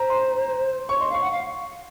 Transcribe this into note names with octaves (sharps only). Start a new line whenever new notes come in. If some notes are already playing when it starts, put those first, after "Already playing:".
Already playing: C5 A#5
C6
C#5 C#6
D#5 C6
F5
C#6
F#5
F5